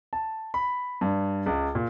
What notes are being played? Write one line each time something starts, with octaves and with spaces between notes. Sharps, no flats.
A5
B5
G2
C#2
A#2